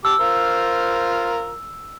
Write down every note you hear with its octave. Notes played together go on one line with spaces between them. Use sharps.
G4 A5 D6 E6
F4 A#4 C5